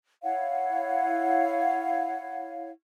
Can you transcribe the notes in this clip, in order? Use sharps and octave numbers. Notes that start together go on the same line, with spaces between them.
E4 C#5 F5 F#5